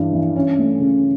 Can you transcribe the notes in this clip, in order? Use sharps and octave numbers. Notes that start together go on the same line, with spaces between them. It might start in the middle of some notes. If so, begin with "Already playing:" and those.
Already playing: G2 E3 D4
E3
C#4
A3
C#3